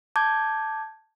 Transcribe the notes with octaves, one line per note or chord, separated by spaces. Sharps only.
A5 D6 G6 G#6